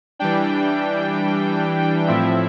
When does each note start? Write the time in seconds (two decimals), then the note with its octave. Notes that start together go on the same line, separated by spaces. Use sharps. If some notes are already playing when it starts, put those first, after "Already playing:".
0.19 E3 G3 D4 G5
2.08 A2 F3 C4 E4 E5